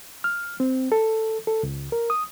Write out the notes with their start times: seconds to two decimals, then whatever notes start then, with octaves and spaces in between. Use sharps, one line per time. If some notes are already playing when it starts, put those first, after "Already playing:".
0.24 F6
0.60 C4
0.92 A4
1.47 A4
1.63 C#2
1.92 A#4
2.10 D#6